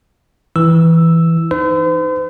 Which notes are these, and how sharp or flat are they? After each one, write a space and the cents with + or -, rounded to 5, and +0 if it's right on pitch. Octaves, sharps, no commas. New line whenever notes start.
E3 +0 E6 +0
D#4 +0 C5 -45